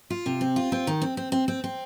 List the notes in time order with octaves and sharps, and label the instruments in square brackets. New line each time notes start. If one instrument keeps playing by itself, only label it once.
[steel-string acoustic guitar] F4
C3
C4
F4
C4
D#3
C4
C4
C4
C4
C4